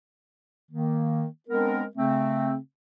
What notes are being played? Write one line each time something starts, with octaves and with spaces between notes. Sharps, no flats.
D#3 A#3
G#3 B3 C4 D4 A#4
C#3 A3 C4